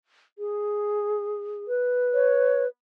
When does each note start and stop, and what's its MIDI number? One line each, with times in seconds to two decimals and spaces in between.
0.39 1.66 68
1.68 2.67 71
2.14 2.63 73